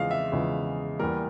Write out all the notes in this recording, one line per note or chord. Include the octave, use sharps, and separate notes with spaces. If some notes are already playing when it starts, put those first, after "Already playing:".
Already playing: E2 C#3 F3 G#3 F5
E5
E2 C#3 F3 G#3
E2 E3 G3 A#3 A#4